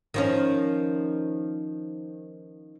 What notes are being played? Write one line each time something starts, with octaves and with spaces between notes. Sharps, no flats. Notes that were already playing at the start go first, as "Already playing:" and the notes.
D#3 F3 C#4